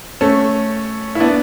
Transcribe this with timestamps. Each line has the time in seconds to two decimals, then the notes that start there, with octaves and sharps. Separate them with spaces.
0.21 A3 C#4
1.15 E4
1.20 B3 D4